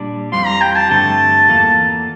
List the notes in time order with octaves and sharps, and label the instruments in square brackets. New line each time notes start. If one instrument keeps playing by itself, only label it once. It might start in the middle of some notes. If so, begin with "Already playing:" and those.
Already playing: [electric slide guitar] A#2 G3 D4
[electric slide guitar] F2 E3 G3 C4 F4 [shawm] C6
[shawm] A#5
G5
A5
[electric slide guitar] G2 D3 A3 C4 G4 [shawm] A5
[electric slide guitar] E2 E3 A#3 F4 A4